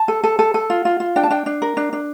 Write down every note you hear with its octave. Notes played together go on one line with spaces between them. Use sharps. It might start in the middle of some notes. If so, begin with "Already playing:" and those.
Already playing: A5
A4
A4
A4
A4
F4
F4
F4
D4 G5
A5
D4 G5
D4
A#4
D4
D4